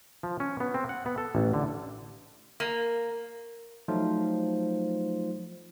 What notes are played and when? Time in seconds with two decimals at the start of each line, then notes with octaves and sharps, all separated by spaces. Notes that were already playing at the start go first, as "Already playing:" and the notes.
0.23 F3
0.40 C#4
0.60 B3
0.74 C4
0.89 F#5
1.06 B3
1.18 A4
1.35 A1
1.54 D3
2.60 A#3
3.88 F3 F#3 A3 D#4 F4 C5